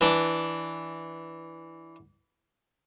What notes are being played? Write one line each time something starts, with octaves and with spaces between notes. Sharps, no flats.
E3 D4 D5